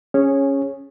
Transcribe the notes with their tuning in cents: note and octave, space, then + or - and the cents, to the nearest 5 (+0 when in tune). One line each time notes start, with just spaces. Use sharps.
C#4 +0 G#4 -10 C#5 -15